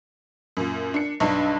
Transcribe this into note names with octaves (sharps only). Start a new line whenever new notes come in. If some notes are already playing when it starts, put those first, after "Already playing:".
F#2 A#2
D4 C#7
B1 G2 D4